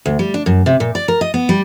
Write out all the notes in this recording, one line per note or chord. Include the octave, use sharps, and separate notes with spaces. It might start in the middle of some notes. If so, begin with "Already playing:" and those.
D2
G3
D4
F#2
C3
A#2
D5
A#4
D#5
B3
G3